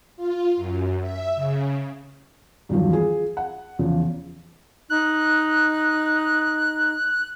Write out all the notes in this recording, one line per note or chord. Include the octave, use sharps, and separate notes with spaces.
F4
F#2
E5
C#3
E2 G2 D#3 F3 F#3
F4 G#4
F#5
E2 C#3 F3
D#4 F#6